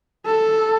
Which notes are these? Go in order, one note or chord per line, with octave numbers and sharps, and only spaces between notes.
A4